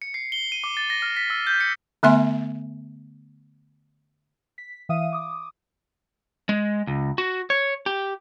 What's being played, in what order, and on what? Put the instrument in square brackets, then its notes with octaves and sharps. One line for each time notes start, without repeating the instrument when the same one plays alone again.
[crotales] C#7
C7
G7
D#7
D6
A6
A#6
F6
B6
E6
G6
C#7
[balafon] D3 A3 B3 E5 G#5 C6
[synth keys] B6
E3 E5 F5 D#6 D#7
D6 D#6
[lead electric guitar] G#3
C#2
F#4
C#5
G4